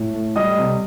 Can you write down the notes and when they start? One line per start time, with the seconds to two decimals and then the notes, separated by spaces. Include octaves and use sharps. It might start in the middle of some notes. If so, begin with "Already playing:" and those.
Already playing: A2
0.14 A3
0.36 G3 D#5 D#6
0.58 C3